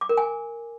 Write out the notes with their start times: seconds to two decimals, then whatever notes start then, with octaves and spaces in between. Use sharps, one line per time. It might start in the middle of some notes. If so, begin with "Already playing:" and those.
0.01 D6
0.09 A#4
0.17 G#5